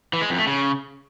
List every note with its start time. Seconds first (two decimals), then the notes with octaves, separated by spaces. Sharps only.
0.13 E3
0.22 G#3
0.30 F2
0.39 A3
0.47 C#3